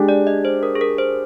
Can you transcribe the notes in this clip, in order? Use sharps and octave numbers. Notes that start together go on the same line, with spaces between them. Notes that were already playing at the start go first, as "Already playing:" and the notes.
Already playing: G#3 D4 G4
D5
D#5
C5
A#4
G#4
A#4
C5